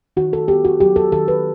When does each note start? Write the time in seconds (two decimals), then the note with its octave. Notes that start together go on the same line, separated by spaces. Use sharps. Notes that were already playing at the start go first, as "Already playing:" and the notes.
0.17 D#3 F#4
0.33 A4
0.48 B3 G4
0.65 F#4
0.80 F#3 G4
0.96 A4
1.12 D#3 A4
1.28 B4